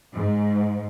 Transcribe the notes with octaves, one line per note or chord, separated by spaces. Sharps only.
G#2